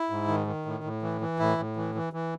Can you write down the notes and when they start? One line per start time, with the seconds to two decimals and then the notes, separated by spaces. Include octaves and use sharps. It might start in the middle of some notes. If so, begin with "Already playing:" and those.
Already playing: E4
0.10 G#2
0.28 D#3
0.47 D#3
0.65 A2
0.84 A2
1.03 E3
1.21 E3
1.39 A2 E4
1.58 A2
1.76 E3
1.95 E3
2.13 E3